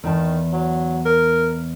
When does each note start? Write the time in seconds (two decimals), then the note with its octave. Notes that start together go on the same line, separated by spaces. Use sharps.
0.04 E2 D#3 A5
0.53 F#3
1.05 A#4